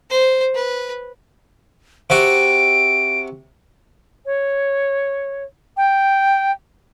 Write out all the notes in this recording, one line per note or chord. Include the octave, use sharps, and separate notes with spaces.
C5
B4
C3 F#4 D7
C#5
G5